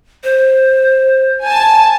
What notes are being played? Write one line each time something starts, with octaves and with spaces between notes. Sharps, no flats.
C5
G#5 A5